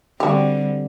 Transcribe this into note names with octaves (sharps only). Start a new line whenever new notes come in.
D3 G3 C4 F#4 G4